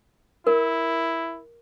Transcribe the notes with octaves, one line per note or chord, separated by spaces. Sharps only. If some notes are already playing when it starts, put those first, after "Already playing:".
E4 A#4